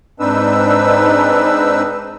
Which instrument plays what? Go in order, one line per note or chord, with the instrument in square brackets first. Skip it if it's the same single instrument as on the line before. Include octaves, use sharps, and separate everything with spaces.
[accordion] G#2 C4 D4 D#4 B4 E6